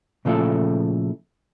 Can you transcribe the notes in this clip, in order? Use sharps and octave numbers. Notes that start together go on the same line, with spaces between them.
A#2 C#3 F3 A3 E4 A4